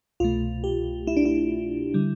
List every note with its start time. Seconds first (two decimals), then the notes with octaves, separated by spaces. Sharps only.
0.20 C2 B2 A3 F4
0.64 G4
1.07 E4
1.17 D4
1.25 E4
1.94 D3 G3